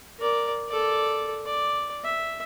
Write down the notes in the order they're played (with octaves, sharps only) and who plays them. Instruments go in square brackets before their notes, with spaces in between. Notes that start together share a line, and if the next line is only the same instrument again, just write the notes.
[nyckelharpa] A#4 D5
A4 D5
D5
E5